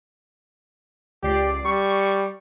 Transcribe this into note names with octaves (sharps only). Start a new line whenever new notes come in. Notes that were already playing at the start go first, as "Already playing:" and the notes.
C#2 G4 D5 C7
G3 C#6